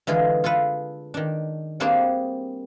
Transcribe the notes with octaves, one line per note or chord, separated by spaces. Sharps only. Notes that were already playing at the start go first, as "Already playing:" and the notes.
D3 E3 G#3 F4 G#4
F4 G#4 A4 B4
D#3 D4
G3 A#3 C4 D4 G4 G#4